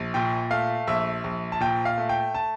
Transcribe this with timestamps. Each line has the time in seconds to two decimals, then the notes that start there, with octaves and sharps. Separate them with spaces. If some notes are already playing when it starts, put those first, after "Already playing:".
Already playing: A#1
0.14 A#2 G5
0.50 A3 F5
0.87 A#1 E5
1.24 A#1
1.52 A5
1.60 A#2 G5
1.85 F5
1.98 A3
2.09 G5
2.35 A5